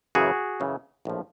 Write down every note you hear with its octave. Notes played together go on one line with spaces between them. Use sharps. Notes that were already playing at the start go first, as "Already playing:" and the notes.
F#2 C#3 E3 F#4 G#4
F#2 C#3 E3
A#1 A2 F3